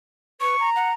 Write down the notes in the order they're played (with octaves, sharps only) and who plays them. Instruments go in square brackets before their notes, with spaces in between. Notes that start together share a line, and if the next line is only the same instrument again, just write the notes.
[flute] B4 [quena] C#6
[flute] A#5
[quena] F#5